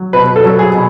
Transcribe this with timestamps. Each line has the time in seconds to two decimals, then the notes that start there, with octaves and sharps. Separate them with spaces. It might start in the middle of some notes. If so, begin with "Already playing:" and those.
Already playing: F#3
0.13 B2 B4
0.36 A4
0.44 F#3
0.59 G#4
0.74 B2